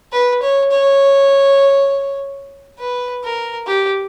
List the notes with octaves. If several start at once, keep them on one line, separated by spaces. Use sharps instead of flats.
B4
C#5
C#5
B4
A#4
G4